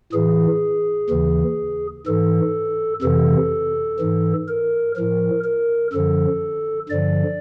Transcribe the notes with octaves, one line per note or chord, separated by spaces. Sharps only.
A2 E3 G#4
D#2 C#3 E3
G#2 E3 A4
F2 C3 E3 A4
G#2 E3
A#4
A2 F3 A#4
A#4
F#2 D3 F3 A4
G2 D3 F3 D5